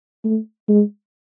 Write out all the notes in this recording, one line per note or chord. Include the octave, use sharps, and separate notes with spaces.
A3
G#3